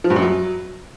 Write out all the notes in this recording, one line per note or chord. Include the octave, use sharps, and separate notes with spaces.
F3
G2
F#2
F#3